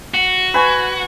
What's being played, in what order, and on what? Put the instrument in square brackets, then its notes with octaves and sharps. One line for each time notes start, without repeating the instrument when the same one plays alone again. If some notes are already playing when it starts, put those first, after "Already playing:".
[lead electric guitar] F#4
[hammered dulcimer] B4 G#5 C#6